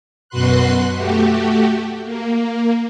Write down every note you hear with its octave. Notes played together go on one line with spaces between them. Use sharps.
F#2 B2 F#4 B4 C6 F#6
A3 F#4 G4
A#3